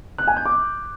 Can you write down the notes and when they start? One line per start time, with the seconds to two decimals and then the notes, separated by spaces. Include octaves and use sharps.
0.18 F#6
0.27 G#5
0.36 G6
0.45 D6